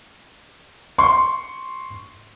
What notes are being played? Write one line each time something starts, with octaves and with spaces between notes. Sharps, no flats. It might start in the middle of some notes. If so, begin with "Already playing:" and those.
C6 C#6